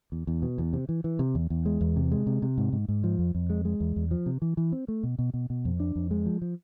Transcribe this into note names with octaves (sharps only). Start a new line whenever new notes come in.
E2
E2
B2
E2
C3
E3
E3
C3
E2
E2
G#3
E2
C3
G#3
C3
C3
G#2
G#2
G#2
F3
F2
F2
G#3
G#3
E2
E2
F3
C3
E3
E3
C4
A3
B2
B2
B2
B2
F2
D4
F2
G#3
F3
F3